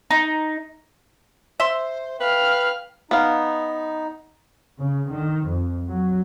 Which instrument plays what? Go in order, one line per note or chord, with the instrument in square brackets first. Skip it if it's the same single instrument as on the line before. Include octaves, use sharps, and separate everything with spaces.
[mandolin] D#4
[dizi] C5 [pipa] E5 C6
[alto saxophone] B4 [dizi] F5 [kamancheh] G5 F6
[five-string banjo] B3 F5 [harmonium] D#4
[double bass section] C#3
D#3
F2
F#3